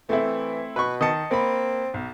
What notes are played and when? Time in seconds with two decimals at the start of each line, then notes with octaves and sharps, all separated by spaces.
0.09 E3 A3 C4 E4
0.76 B2 B4 C#6
1.01 D#3 D#5 A5 C#7
1.31 A#3 C4 B5
1.94 B1